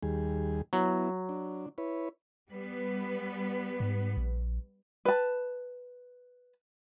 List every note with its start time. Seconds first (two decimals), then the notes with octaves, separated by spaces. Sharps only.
0.03 D#2 G3 G#4
0.73 F#3 B3 E4
1.29 D4
1.78 E4 B4 C#5
2.50 G3 B3 B4
3.80 G#2
4.17 A#1
5.05 B4 A5